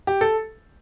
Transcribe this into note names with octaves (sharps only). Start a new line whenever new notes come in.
G4
A4